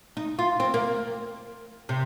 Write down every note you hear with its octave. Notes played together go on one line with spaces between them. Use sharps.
D#4
F4
C4
A#3
C3